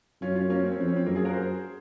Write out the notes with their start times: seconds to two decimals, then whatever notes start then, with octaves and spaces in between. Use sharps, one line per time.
0.21 F#2 C#4 F4
0.35 C#4 F4
0.50 A#3 C#4
0.63 C4
0.72 C#4
0.78 F2 C4
0.88 C#4
0.96 C4
1.05 F#2 A#3
1.15 F4 G#4
1.25 F#4 A#4
1.33 G#4 C5